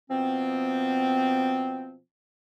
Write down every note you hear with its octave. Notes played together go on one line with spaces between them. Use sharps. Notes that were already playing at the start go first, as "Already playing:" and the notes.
B2 F3 B3 C4